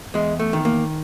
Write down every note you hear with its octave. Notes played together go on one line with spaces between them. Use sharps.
E2 G#3
A3
D#3
A#3